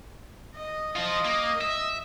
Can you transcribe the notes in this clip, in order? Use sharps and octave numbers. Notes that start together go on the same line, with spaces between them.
D#5
F3 F4 D#5
A#3
E5